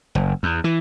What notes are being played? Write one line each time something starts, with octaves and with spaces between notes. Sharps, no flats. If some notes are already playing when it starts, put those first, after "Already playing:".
F#1
E2
E3